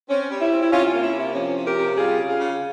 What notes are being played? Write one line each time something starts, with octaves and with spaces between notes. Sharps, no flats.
C4 C#4
G3
E4
C4
E4
C3 C#4 F4
C#4 F4
A#3
E4
C3
E4
F3 C#4
C3
G4 A#4
C3
G3 F4 G#4
C#3
F4 G#4
C#3